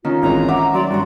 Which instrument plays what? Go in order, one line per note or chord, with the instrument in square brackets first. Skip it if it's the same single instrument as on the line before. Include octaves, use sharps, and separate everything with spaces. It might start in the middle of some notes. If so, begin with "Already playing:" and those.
[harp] D#3 C#4 [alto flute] F4
[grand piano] G#1 E3 G#3 [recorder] A#5
[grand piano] E5 D6 [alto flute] F#5
[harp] F#3 [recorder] D5 [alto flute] C6
[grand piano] G2 A#5 [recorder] F#4